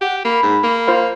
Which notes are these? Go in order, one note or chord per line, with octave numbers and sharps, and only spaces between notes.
G4 F#5
A#3 B5
G#2
A#3
F4 C5 F5